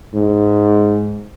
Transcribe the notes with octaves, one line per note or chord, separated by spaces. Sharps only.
G#2